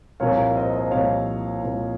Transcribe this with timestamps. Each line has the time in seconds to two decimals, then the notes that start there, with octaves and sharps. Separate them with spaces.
0.20 C2 A#2 F3 A#3 C#5 F5
0.38 C#5 F5
0.56 C5 D#5
0.73 C5 D#5
0.91 C2 A#2 F3 A#3 C#5 F5
1.62 C2 A#2 F3 A#3